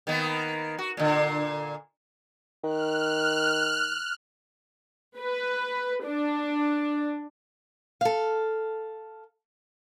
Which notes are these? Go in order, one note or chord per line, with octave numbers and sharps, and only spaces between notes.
D#3 A#3 B3
F#4
A#2 D3
D#3 F6 F#6
B4
D4
A4 F5